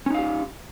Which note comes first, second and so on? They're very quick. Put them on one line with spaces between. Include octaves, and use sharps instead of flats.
C#4 D#4 F5 G4